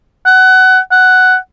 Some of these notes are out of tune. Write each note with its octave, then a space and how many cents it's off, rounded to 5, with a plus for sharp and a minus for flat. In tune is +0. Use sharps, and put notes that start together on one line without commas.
F#5 +20
F#5 +5